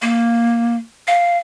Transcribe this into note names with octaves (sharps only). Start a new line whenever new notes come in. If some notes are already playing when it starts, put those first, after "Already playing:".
A#3
F5